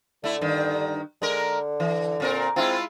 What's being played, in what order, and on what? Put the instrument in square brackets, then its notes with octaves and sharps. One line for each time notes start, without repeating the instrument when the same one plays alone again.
[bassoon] D3 [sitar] A3 E4
[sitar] G2 D#3
[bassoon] D3 [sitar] G#3 A#4
[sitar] E3
A#2 C4 A#4
[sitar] G#3 E4 F4 [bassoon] C4